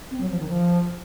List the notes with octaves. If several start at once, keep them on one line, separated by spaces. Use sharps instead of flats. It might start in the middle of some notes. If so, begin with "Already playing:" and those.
C4
F#3
F3
D#3
F3